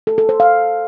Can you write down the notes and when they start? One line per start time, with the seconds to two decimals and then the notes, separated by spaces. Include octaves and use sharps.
0.07 A4
0.18 A4
0.29 C5
0.40 F5